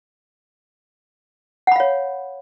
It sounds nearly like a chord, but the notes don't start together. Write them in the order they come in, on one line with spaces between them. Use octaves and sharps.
F#5 B5 F5 C#5